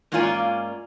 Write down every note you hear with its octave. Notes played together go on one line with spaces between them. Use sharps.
G#2 A#3 C#4 F4 D5 G#5